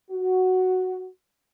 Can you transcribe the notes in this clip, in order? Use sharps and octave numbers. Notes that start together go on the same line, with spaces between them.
F#4